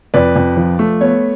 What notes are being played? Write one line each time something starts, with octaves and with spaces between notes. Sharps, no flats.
F2 B4 D5
F2
F3
A3
B3 C#5